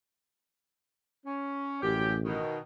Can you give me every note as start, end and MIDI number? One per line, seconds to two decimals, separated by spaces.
1.26 1.78 61
1.83 2.39 33
1.83 2.14 42
1.83 2.14 67
2.24 2.58 47
2.24 2.58 51